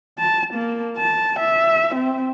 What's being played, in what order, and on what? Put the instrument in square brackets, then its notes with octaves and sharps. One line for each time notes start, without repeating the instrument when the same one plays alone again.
[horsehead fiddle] A5
A#3
A5
E5
C4